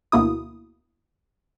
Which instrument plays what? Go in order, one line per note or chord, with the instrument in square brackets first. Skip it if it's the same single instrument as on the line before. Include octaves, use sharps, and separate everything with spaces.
[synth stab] D2 B2 A#3 E4 D#6